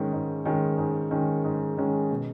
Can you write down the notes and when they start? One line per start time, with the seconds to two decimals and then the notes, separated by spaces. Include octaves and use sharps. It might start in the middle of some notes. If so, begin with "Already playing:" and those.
Already playing: G#2 D#3 G#3 C#4
0.13 G#2
0.45 D#3 G#3 C#4
0.78 G#2
1.11 D#3 G#3 C#4
1.45 G#2
1.78 D#3 G#3 C#4
2.11 B2